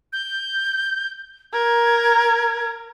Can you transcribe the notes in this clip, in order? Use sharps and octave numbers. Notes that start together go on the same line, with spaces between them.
G6
A#4 G#6